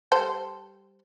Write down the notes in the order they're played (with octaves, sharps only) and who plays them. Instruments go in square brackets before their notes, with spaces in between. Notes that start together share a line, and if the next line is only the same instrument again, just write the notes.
[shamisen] G3 A4 C5